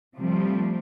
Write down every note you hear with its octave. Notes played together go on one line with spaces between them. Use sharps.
C3 F3 G3 A3 C4